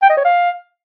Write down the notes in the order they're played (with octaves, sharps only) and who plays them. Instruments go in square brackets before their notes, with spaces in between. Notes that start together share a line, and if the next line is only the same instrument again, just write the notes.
[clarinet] G5
D#5
C#5
F5